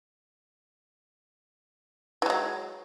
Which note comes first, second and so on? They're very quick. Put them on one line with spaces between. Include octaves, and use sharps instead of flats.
E3 G#3 F#3